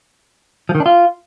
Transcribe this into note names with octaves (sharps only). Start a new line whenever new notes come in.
F3
D#3
D4
F4